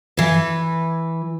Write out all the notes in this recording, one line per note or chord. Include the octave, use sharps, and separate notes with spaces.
E3 B4